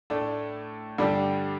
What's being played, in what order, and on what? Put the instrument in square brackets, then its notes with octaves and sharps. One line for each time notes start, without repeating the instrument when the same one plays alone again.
[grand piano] A2 A3 D4
G2 D3 G3 D4 G4